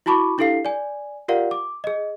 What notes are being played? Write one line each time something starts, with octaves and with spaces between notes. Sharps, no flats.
E4 F#4 A5 B5 C#6 D6
D4 E4 G4 A4 F5 C7
D5 G#5
F4 G4 A#4 D5 F5 F#5
D6
G#4 D#5